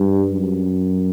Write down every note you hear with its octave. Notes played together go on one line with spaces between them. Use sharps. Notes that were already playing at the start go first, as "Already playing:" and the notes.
Already playing: G2
F#2